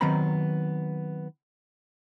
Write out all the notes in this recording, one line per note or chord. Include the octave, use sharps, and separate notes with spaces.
D#3 F#3 B3 C4 A#5 B5